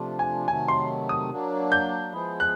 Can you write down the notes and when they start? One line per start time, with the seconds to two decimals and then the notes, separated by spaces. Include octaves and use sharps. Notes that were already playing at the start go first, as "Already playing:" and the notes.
Already playing: C3 F3 A3 D4 F4
0.19 G#5
0.47 C3 D#3 F#3 A3 G#5
0.68 C6
1.09 D#6
1.30 F#3 A#3 D4
1.72 G6
2.13 F3 G#3 B3 E4 G#4
2.40 F#6